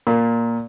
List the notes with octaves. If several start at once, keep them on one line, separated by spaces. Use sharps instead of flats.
A#2